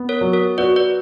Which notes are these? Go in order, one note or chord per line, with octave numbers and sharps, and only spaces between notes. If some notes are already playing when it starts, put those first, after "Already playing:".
Already playing: B3
A#4 C#5
F#3
A#4 C#5
F#4 B4 D5
B4 D5